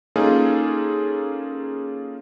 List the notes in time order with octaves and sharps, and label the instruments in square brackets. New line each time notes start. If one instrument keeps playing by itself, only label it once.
[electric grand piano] A#3 C#4 D#4 F4 G#4 A4